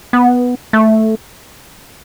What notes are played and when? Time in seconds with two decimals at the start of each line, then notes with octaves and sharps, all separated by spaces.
0.13 B3
0.73 A3